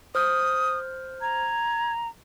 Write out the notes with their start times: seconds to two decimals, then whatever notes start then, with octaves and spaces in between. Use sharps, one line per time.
0.15 C5 D#6 F6 G6
1.21 A#5 G#6